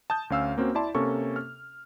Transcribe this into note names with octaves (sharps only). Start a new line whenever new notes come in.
A5 D#6 G6
D2 C#4 F5 E6
A#3 C4 C#4 F#4
E4 D5 A5 C6
C3 A#3 C#4 A4 C#6
F6